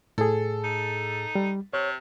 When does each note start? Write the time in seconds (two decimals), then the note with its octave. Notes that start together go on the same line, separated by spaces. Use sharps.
0.18 A2 G#4 A4
0.64 D#4
1.35 G3
1.73 C3 C#5